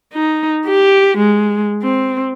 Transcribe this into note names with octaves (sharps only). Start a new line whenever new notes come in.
D#4
G4
G#3
C4